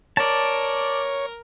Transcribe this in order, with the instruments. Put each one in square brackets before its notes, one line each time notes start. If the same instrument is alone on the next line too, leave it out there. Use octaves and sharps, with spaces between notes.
[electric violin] A#4 [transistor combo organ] C#5 [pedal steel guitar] D5 A5